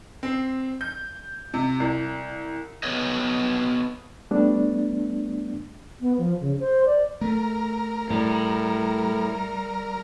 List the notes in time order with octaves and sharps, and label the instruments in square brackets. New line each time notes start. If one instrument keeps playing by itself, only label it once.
[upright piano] C4
G6
C3
C2
[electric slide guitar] B3 B4 C#5 D#5
[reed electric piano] G3 A3 B3 D4
[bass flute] B3
F3
C#3
C5
D5
[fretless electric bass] A3 [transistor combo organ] A#4
[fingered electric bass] A2 [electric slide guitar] G3